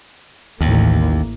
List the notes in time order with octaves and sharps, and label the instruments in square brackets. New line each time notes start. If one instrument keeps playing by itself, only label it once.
[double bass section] A1 A#3 [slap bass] D#2